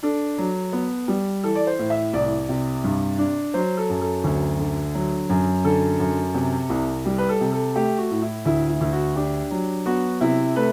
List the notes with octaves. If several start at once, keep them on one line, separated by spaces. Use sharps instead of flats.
D4 A4
F#3
B3
G3
E3 A4
D5
C5
A2
E5
C2 D5
C3
G2
D4
F#3 C5
A4
F#2
A4
D2
D3
F#3
F#2
D3 A4
F#2
C3
C2
G3
B4
A4
C3
A4
A3 G4
F#4
A2
E4
D2 E4
E4
D2
F#4
D4 G4
F#3
B3 F#4
C3 E4
A3 B4